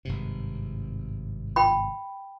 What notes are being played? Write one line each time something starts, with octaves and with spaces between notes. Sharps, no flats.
G#1 G2 C3
G5 B5